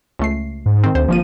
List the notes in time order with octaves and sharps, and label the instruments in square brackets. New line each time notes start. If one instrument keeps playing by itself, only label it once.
[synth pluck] C#2 A3 C7
[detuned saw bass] G#2
[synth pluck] D#3 C4
[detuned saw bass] D2 [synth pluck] C5
[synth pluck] G1 A#3 D#7 [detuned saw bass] F3